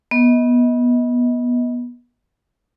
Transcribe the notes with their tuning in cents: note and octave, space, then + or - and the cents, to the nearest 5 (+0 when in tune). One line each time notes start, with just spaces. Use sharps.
B3 -20 D#5 +30